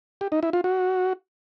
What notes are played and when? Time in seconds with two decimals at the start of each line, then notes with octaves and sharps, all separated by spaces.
0.21 G4
0.32 D#4
0.43 E4
0.53 F4
0.64 F#4